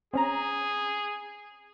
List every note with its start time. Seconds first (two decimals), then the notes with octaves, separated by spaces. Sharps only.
0.13 C4 C#4 G#4 A#5